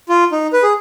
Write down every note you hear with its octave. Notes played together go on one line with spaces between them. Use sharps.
F4
D#4
B4
G#4